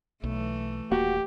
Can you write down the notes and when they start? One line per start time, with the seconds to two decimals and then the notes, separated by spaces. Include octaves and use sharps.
0.24 B1 E3 A3
0.92 D#1 A#3 F#4 G4